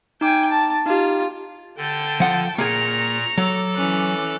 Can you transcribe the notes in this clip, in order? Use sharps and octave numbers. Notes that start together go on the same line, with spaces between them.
D#4 G5 G#5 D6
A5
D#4 F4 G4
D3 G5 A5 G6
F3 F#5
A#2 A#3 G#4 A#5 C#6
F#3 A4 D6
E3 C#4 F#6